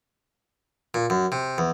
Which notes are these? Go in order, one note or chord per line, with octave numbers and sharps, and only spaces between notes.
A#2
F#2
C3
E2